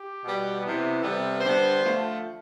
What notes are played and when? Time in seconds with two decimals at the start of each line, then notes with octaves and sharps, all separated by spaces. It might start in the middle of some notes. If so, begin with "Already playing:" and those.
Already playing: G4
0.22 B2 G3 B3
0.62 C3 E3 B3
1.01 C3 G3 B3 A4
1.41 D3 G3 B3 C5
1.80 D3 F3 A3